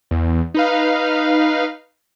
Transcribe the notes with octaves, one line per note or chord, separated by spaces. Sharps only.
E2
D#4 B4 F5